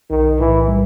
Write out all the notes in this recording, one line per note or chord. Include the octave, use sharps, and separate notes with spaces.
B1 D#3
A2 E3
G3